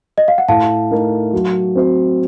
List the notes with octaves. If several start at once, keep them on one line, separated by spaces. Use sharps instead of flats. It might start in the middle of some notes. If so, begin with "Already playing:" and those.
D#5
F5
F#5
A2 F5 A5
A3 D#4 A#4
F#3
C4 F#4 C5